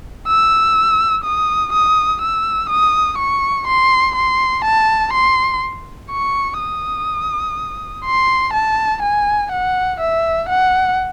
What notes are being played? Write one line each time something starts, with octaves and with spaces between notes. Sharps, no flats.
E6
D#6
D#6
E6
D#6
C#6
C6
C6
A5
C6
C#6
D#6
C6
A5
G#5
F#5
E5
F#5